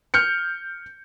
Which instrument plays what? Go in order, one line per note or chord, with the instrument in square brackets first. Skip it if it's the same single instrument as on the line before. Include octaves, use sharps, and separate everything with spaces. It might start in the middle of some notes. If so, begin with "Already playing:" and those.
[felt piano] F6 G6 C#7